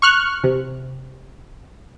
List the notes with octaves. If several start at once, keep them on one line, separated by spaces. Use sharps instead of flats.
C#6 F6 F#6
C3